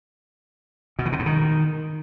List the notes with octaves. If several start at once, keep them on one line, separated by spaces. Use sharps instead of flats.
B2
E3
C3
G2
D#3